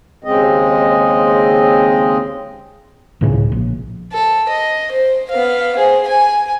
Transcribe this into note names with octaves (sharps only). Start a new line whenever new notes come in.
D#2 C#3 G#3 C4 D#5
C#2 A2 C#3
A#1
A4
D#5
C5
B3 F5
G#4 C5
G#5